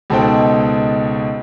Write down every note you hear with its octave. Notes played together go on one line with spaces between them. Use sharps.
C#2 B2 D#4 A4 C5 G5